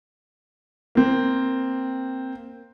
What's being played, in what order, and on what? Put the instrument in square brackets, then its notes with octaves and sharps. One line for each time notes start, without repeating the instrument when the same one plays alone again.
[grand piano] A#3 C4